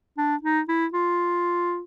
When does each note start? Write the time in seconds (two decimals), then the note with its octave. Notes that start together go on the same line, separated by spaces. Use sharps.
0.18 D4
0.43 D#4
0.68 E4
0.93 F4